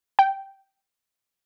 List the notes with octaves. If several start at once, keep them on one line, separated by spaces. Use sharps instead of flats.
G5